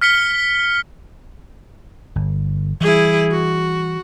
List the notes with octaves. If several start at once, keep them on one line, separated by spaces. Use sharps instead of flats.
F6 B6 C#7 G7
G1
E3 G3 E4 G#4
F#4